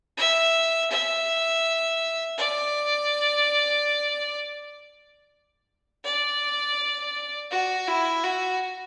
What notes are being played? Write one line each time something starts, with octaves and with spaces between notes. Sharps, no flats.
E5
E5
D5
D5
F#4
E4
F#4